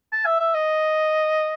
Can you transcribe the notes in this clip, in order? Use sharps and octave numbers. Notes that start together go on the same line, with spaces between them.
A5
E5
E5
D#5